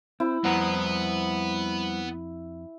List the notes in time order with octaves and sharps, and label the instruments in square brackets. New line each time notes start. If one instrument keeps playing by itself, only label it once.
[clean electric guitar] C4 [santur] E4
[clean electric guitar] F2 F#5 [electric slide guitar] G3 C5 A#5 [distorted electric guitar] B3